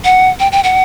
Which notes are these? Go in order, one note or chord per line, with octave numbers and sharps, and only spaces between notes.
F#5
G5
G5
F#5